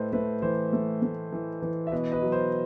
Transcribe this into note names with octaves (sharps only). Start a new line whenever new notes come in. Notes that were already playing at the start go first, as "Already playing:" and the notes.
Already playing: A2 A3 B4 C5 D#5
A3 B4
E3 C5
A3
A3
E3
E3
E5
B2 B4 D#5
B4 D#5
F#3
C5